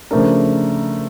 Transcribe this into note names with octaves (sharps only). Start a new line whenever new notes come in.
C#3 F3 A3 D4 A#4